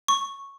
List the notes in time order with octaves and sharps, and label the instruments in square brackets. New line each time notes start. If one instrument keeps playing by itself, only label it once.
[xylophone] C#6